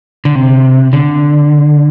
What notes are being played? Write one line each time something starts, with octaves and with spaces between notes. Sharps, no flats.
D3
C3
D3